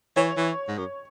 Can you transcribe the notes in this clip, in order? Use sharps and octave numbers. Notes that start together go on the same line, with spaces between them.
E3 C#5
E3
G#2
F#2